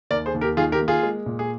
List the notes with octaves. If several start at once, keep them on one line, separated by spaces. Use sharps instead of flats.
D#2 A#4 D5
G#4 C5
D#2
G4 A#4
D#3 F4 G#4
G4 A#4
A#3
F4 G#4
G#3
A#2
G#4